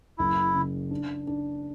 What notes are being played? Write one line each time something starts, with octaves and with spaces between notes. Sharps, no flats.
F#1 E4
C#3
D4
D4